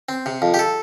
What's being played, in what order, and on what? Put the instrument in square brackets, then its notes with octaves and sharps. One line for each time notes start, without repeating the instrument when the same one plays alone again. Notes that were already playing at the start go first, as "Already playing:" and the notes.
[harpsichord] C4
C3
F2
G4
A4